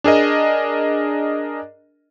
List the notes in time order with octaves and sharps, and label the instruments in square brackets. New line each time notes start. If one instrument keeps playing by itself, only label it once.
[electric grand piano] D4 G#4 A#4 D#5